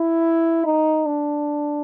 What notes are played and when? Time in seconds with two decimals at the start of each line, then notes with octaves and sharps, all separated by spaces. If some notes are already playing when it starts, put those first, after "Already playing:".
Already playing: E4
0.65 D#4
1.06 D4